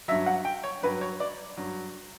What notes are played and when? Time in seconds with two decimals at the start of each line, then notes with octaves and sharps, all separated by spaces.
0.08 G2 F#3 E5
0.26 F#5
0.45 G5
0.63 C#5
0.82 G2 F#3 B4
1.01 C#5
1.20 D5
1.57 G2 F#3